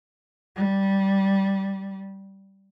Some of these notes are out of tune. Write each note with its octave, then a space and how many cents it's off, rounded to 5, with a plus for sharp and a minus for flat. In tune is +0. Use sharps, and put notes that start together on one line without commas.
G3 -10